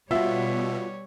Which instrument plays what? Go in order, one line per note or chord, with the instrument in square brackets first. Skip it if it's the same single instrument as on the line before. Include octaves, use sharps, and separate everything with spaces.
[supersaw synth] B2 [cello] G3 C#5 [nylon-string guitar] F4 F#4 [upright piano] E5